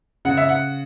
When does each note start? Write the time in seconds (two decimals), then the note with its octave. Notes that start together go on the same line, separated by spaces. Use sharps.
0.25 C#3 F#5
0.37 E5
0.49 F#5